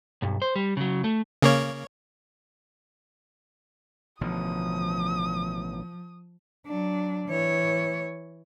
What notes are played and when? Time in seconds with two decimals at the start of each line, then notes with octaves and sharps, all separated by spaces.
0.22 B1 G2
0.42 C5
0.56 G3
0.77 C#3 F#3
1.04 A3
1.42 C#3 A#3 C#5
4.21 A1 B2 D3 F3 D#6
6.67 F#3 D4
7.29 E3 C#5